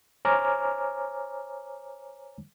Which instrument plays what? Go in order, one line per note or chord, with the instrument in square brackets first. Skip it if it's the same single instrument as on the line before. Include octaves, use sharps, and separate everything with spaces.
[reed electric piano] C5 C#5 G#5 A#5 D6 F6